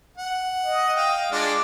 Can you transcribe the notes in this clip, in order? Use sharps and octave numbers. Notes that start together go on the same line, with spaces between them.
F#5
D#5
F5 G5
G#3 D4 F4 D5